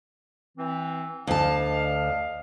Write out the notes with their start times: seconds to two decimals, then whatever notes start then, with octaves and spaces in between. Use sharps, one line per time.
0.58 E3 C4
1.27 D2 D4 D#5 F5 A5